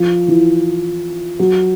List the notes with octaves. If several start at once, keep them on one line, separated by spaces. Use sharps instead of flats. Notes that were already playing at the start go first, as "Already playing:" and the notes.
Already playing: F3
E3
F#3